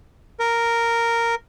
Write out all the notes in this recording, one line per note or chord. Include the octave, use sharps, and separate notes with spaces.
A#4